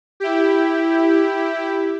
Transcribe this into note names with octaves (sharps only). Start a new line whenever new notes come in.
E4 G4